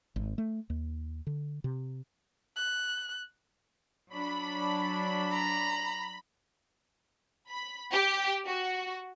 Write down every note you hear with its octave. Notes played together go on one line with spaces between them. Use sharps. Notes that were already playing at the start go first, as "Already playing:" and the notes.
G#1
A3
D#2
D3
C3
F#6
F#3 D4 B5
A#5
B5
G4
F#4